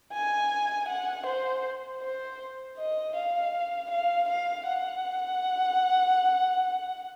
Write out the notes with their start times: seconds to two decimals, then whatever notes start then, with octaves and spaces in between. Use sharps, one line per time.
0.13 G#5
0.88 F#5
1.26 C5
2.01 C5
2.78 D#5
3.16 F5
3.91 F5
4.28 F5
4.66 F#5